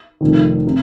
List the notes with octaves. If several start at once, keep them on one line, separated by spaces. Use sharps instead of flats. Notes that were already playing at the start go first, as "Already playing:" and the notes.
F1 F2 D#3
C3